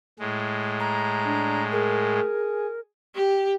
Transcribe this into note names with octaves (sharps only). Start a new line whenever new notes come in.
A2 G#3
A#5
D4
G#4 A#4
G4